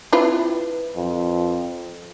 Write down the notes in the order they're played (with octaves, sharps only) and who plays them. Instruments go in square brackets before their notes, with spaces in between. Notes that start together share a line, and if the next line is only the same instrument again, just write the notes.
[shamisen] C4 E4 F4 [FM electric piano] B4
[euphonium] F2